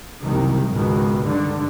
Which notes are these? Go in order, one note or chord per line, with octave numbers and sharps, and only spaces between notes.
F#1 C2 C3 D#3
C#2 G#2 B2 D#3
G2 D3 D#3